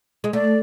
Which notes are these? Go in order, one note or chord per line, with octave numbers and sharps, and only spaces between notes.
G#3
A3 D5